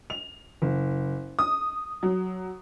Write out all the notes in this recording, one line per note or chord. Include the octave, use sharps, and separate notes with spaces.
F7
F#1
D#6
F#3